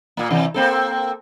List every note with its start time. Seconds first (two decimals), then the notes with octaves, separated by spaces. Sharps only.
0.17 A#2 A#3
0.30 C3 E3
0.54 A#3 C4 A4